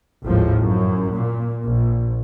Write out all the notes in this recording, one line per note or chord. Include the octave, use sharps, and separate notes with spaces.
G#1 D#2 A2 F3
F#2
A#2
A#1